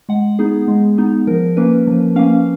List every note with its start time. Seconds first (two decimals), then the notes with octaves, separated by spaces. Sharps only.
0.09 G#3 F#5
0.39 B3 D#4 G#4
0.68 G#3
0.98 B3 D#4
1.27 F3 A#4
1.57 A#3 C#4 B4
1.87 F3
2.16 A#3 C#4 F5